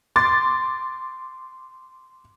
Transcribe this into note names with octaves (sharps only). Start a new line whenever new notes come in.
C6 D6 A6